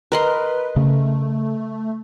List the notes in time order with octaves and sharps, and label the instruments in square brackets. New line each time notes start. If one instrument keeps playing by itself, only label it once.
[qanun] A#4 D#5 C6 [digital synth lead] B4
[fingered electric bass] C#3 [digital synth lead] A3